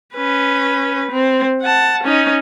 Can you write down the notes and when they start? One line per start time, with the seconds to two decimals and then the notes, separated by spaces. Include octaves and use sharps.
0.15 C#4 B4
1.11 C4
1.62 F#5 A5
2.03 C#4 D#4